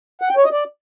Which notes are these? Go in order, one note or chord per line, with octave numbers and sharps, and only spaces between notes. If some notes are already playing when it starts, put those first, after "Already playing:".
F#5
G5
C#5
D#5
D5